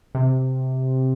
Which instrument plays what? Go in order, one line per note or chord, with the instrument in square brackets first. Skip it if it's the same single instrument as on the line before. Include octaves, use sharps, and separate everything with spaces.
[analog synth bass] C3